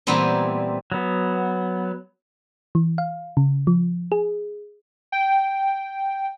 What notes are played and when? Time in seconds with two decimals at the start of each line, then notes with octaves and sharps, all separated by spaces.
0.07 A#2 E3 G3 B3 C4
0.92 F#3 B3
2.75 E3
2.98 F5
3.37 C#3
3.67 F3
4.12 G#4
5.12 G5